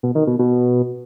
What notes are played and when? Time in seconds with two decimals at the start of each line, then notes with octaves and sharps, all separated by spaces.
0.03 B2
0.15 D#3
0.27 B2
0.39 B2